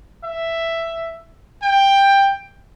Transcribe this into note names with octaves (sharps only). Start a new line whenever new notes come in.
E5
G5